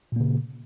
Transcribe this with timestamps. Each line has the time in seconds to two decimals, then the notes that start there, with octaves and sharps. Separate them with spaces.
0.12 A#2
0.16 A#3
0.20 C#3